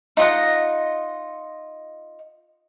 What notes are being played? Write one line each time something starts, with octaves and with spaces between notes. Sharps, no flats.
D#4 F4 D#5 F#5